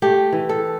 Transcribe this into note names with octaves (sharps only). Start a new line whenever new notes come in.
A3 G4
E3
A4